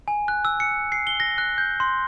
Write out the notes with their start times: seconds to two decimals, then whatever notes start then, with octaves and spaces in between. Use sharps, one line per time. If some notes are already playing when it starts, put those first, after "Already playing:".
0.08 G#5
0.28 F#6
0.45 E6
0.60 C#7
0.92 C7
1.07 G7
1.20 A#6
1.38 F#6
1.58 G6
1.80 C6